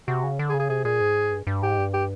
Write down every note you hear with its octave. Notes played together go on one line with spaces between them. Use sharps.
C3 F#4
C#3
D3
G#4
C#3
G#4
C3 G#4
A#2 G#4
G#2
G2
G2
G#2 G4
G2
G4